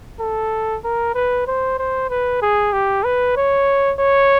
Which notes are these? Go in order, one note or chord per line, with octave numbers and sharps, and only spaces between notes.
A4
A#4
B4
C5
C5
B4
G#4
G4
B4
C#5
C#5